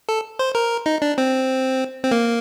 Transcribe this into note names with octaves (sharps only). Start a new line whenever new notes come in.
A4
C5
A#4
D#4
D4
C4
C4
A#3